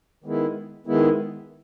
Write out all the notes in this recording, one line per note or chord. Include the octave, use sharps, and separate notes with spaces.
D#3 G#3 B3 E4
D#3 G#3 B3 E4